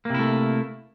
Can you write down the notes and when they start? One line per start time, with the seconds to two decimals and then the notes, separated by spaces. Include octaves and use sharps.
0.05 A#3
0.10 C3
0.14 E4
0.19 A3